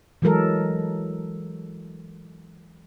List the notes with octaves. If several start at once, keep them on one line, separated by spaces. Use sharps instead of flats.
E3 F#3 G#3 A4 A#4